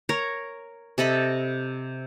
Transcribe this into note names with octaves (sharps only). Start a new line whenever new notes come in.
A#4 C#5 A#5
C3 A4 D#5 B5